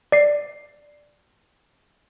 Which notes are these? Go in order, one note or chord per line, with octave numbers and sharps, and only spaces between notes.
D5 C7